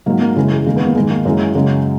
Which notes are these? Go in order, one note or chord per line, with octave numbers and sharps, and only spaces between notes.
G#2 F#3 A#3
A#3
F#2 C#3 E3 G#3
G#3
E2 D#3 G#3 A#3
B3
A#3
G#2 D#3 G#3
A#3
F#2 E3 G#3
F#2 C#3 F#3 G#3